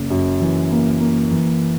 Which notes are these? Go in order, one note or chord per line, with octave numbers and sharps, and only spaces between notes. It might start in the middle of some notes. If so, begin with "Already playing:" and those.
Already playing: F#1
F#2
E3
A#3
A#3
E3